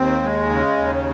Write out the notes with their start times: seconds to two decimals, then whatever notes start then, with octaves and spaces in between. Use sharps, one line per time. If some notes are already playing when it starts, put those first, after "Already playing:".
Already playing: D#2 C4
0.22 G#3
0.50 C#3
0.77 D#2